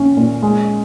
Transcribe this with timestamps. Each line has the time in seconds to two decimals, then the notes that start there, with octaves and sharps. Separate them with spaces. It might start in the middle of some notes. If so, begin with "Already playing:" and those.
Already playing: A#1 C#4
0.17 A#2
0.42 G#3